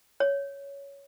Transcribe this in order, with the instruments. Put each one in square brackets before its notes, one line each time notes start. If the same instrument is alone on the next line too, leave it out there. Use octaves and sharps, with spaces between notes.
[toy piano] C#5